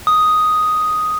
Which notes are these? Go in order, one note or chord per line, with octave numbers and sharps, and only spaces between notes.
D#6